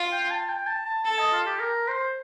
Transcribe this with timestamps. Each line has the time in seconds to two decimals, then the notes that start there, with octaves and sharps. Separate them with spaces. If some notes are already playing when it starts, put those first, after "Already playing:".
Already playing: F4
0.12 G5
0.31 A5
0.49 G5
0.67 A5
0.85 A5
1.04 A4 A5
1.18 D#5
1.33 F4
1.46 G4
1.60 A#4
1.88 C5